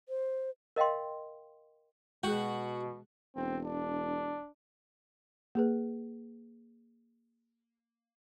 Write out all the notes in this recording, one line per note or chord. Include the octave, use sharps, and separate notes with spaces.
C5
A#4 D#5 F5 G5 C6
B2 G#3 F#4 G#4
E1 C4
D4
A#3 G#4 B4